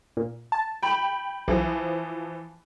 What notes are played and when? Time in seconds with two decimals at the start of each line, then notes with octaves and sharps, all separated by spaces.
0.17 A#2
0.52 A5
0.83 G5 B5
1.48 B1 E3 F3